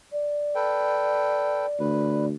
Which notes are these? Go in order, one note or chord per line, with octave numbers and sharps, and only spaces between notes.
D5
A4 B4 G5
D2 B4